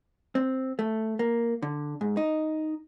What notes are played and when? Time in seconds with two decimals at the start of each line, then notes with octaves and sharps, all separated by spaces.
0.35 C4
0.79 A3
1.19 A#3
1.62 D3
2.01 G#2
2.17 D#4